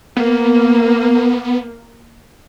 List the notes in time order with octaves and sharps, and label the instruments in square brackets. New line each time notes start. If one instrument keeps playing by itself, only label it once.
[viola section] A#3 [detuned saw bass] B3